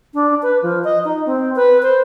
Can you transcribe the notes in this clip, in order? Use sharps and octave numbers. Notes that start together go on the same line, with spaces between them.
D4
B4
F3
D#5
D#4
C4
B4
C5